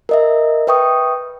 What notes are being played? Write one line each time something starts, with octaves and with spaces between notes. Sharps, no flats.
A#4 D#5 E5
B4 E5 G5 C#6 D#6